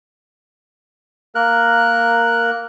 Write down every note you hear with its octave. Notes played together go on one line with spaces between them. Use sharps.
A#3 A#4 F#6